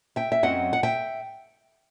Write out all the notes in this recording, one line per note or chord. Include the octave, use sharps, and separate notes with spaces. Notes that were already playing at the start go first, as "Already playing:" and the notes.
E5 G5
E5
F#2 F#3 C4 D#5 F#5
F#5
E5 G5